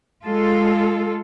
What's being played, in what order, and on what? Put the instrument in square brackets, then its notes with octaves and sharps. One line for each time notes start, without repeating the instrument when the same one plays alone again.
[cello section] G#3 F4 A4